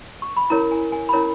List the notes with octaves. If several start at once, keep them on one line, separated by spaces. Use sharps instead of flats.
C#6
B5
C#4 E4 A#4 C#5 A#5
G#5
G#5
B5
C#4 E4 A#4 C#5 A#5